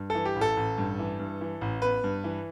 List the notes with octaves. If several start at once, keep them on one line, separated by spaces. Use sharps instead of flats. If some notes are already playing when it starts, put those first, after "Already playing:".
Already playing: G2
E3 A4
G4
A1
A4
A1
G2
E3
G2
E3
A1
B3 B4
G2
E3